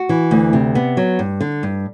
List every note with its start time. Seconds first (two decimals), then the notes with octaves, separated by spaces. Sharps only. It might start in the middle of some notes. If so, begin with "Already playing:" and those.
Already playing: F#4
0.09 E3
0.31 D2
0.53 C3
0.75 B3
0.97 F#3
1.19 G2
1.41 D3
1.63 G2